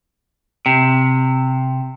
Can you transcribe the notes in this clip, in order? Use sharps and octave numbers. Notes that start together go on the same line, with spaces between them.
C3